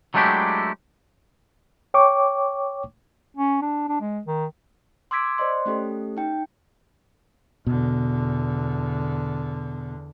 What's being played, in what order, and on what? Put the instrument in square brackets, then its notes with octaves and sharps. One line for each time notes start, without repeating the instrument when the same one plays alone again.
[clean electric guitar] F#3 G#3 A3 D4 E4 G4
[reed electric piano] C#5 G5 C#6 D6
[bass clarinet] C#4
D4
D4
G#3
D#3
[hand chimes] C6 D6 E6 G#6 B6 D7
C5 D5 D#5 C6
A3 C#4 G4 A4
D#4 G5
[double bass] E2 D3 [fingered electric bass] B2